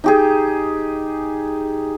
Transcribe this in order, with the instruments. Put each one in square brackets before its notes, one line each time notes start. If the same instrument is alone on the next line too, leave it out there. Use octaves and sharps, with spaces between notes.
[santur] D#4 G4 G#4